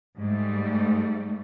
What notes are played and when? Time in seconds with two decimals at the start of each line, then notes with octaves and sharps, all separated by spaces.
0.17 G#2 G3 A3